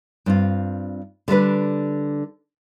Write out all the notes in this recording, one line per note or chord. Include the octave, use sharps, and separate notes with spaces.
G2 C4 F4
D3 G3 D4 B4